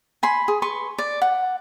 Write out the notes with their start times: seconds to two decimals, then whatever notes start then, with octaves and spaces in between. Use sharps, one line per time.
0.23 G#5 B5 C6
0.48 G#4
0.62 B4 C6 C#6
0.98 D5
1.22 F#5